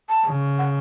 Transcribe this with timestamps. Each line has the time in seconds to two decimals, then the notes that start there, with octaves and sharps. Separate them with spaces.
0.09 A5
0.25 C#3
0.58 F#5